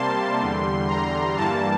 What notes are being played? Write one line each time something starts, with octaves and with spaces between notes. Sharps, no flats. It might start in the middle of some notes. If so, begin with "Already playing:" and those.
Already playing: C3 G3 A#3 A5 C6
E2 D3 G3
A#5
G2 E3 G3 A#3 A5